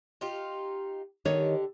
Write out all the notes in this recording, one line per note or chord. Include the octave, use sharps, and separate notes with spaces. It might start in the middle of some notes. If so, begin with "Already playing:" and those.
D#4 F4 G4
D3 D#3 G4 C#5 D#5